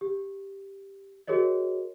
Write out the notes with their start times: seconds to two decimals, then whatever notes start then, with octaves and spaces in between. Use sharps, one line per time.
0.01 G4
1.27 F#4 G#4 A#4 C#5 D#5